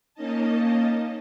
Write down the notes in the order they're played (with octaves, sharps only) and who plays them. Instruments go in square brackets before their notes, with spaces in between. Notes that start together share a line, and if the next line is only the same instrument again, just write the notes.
[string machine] A#3 C#4 D#4 D#5 A5